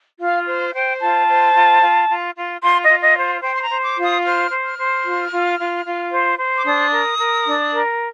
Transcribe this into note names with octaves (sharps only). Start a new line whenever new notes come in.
F4 F5
C5
C5 G5
F4 A5
C5
F4
F4
F4
F4
F4 C6
D#5
F4
D#5
C5
C5 G5
C6
A#5
C5
D6
F4
D#6
C5 F6
C5
F6
C5
F4
F4
F4
F4
C5
C5
D6
D4 D#6
A#4
A#4
D4
A#4